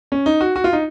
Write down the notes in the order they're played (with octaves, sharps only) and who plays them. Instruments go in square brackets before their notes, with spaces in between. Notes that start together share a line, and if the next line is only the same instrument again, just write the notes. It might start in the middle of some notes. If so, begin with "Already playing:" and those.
[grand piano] C#4
D#4
F#4
F#4
F4
D#4